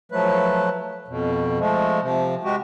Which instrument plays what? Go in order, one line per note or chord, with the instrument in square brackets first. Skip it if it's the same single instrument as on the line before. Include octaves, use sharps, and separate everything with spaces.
[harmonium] F3 F#3 A3 B4
F2 B2
F3 G#3 A3
C3 F3
G#3 F#4 G4